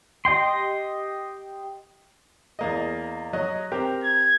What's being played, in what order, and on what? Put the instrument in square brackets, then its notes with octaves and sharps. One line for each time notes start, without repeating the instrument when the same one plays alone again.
[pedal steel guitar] G4 D#5 G5 C6
[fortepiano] E2 A#3 D#5
F#3 F#4 D#5
C4 G4 A#4
[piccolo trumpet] G#6